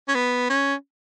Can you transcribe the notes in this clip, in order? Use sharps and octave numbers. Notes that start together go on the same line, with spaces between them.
C#4
B3
C#4